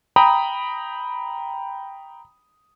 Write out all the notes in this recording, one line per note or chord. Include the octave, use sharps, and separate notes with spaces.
G5 A#5 B5 D#6